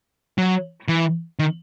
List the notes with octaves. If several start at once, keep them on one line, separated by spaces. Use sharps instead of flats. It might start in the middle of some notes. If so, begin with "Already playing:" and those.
F#3
E3
D#3